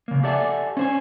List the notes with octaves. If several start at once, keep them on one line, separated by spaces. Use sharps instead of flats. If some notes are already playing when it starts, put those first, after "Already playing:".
C#3 A#3
G4 A4 D5 E5 F#5 G#5
C#4 C5 G#5